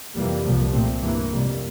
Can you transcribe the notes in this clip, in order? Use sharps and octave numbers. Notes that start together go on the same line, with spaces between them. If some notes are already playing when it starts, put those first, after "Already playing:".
F2 C3 E3 G3 A#3
C2 A#2 F3
A#2 A3 C4
G2 E3 A#3
F2 C3 G3 A#3